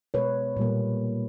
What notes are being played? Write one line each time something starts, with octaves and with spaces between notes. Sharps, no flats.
B2 G#3 B4 C#5
A#2 G3 A#3